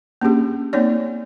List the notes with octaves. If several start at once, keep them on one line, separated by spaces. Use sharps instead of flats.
A#3 C#4 D4 G4 G#4
A#3 C4 D#4 C#5 D5